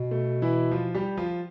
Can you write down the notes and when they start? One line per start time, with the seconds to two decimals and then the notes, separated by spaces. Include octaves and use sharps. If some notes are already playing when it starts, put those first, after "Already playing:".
Already playing: B2
0.11 A3
0.42 E3 E4
0.71 F3 F4
0.95 G3 G4
1.17 F3 F4